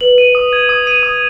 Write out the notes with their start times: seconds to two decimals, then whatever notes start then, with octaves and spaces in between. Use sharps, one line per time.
0.01 B4 F#7
0.18 D#7
0.35 D#6
0.53 G#6
0.69 D#6
0.87 D#7
1.03 D#6